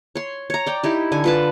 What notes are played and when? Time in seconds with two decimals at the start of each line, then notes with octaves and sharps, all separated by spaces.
0.15 C#5 C6
0.50 C#5 A#5
0.66 D5 G5
0.83 D#4 E4 G4
1.12 D3 G#5
1.24 F4 B4 A5